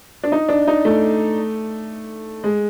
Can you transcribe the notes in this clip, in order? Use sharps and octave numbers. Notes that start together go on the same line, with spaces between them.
D4
D#4
D4
D#4
A3
G#3